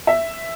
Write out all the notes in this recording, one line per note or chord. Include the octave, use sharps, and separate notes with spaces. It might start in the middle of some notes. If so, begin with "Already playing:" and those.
E5